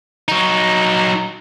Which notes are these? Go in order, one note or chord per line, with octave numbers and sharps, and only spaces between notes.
F#3 D#4